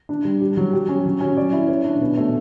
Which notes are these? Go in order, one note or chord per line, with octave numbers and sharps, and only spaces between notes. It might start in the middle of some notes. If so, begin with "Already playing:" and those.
D4
G3
G4
F#3
G4
C#4
F#3
C#4
D5
E4
C#5
D4
B2
A3